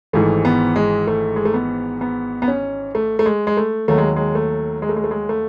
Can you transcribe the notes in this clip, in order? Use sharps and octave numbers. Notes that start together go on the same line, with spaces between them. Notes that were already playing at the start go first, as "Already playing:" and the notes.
G#1 G#2 E3 A3
B3
G#3
A3
G#3
A3
B3
B3
B3
C#4
A3
A3
G#3
G#3
A3
D#2 D#3 F#3 A3
G#3
G#3
A3
G#3
A3
G#3
A3
G#3
A3